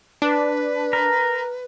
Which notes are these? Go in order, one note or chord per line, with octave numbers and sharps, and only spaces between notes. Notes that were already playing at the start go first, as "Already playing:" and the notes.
D4 B4
A#4